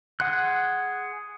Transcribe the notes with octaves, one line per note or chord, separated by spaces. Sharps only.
G#4 F#5 C6 F#6